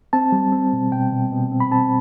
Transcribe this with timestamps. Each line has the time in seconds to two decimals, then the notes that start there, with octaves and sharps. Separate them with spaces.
0.13 C4 A5
0.32 G3
0.52 C4
0.73 B2
0.92 B2 G5
1.12 B2
1.32 B2
1.52 C4
1.60 B5
1.72 C4 A5